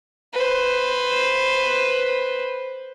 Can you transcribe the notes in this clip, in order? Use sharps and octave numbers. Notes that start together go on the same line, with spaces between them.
B4 C5